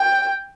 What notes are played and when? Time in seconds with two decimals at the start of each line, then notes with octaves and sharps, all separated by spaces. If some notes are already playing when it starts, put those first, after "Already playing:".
Already playing: G5